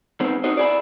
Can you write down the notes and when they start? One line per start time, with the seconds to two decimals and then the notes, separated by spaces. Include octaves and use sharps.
0.20 D#3 G#3 B3 C4
0.44 C4 D#4 F#4 C5 D#5
0.57 E4 G#4 D5